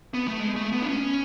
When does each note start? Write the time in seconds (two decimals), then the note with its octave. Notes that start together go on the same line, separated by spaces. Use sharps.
0.14 B3
0.28 A3
0.40 G#3
0.56 A3
0.72 B3
0.82 D4
0.88 C#4